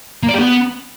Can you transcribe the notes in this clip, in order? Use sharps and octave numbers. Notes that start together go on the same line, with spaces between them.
A#3
D5
G4
B3